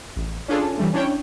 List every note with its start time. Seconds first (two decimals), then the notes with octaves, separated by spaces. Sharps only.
0.16 A1
0.48 C#4 D4 F4 G#4 A4
0.78 E3 G3 A3
0.93 C#4 D4 E4 C#5 G5